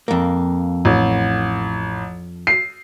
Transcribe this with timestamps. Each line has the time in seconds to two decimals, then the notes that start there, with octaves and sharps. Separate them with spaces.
0.08 F2 A#3
0.85 A1
2.47 C7